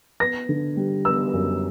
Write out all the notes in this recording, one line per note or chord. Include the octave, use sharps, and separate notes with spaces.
B3 A#6
D3
G3
B3 E6
F#2